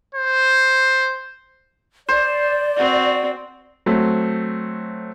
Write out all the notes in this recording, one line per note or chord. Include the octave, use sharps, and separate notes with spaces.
C5
C5 D5
C4 F#4
F#3 A3 C4